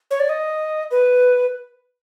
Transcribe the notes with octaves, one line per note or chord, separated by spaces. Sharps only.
C#5
D5
D#5
B4